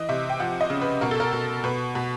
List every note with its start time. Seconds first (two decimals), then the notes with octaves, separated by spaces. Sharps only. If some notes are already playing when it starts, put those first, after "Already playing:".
Already playing: E3 D#5
0.09 C3 E5
0.30 G5
0.40 F3 F#5
0.61 D#5
0.70 C#3
0.81 B4
1.01 B2 A#4
1.11 A4
1.20 A#4
1.33 B2
1.64 B2 B4
1.95 B2